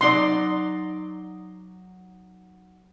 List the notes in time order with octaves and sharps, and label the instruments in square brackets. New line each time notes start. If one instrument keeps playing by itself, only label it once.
[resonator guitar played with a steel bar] F#3 D#4 D5 [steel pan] C6